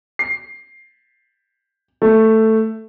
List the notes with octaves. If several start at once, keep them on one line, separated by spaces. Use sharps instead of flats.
C7
A3